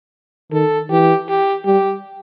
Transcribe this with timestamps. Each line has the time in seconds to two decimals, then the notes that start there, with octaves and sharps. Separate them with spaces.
0.52 D#3 A4
0.90 E3 G4
1.28 G4
1.65 G3 G4